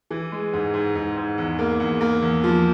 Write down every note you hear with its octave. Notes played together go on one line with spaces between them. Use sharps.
E3
G#3
G#2
G#2
G#2
G#2
E2
A#3
E2
A#3
E2
F3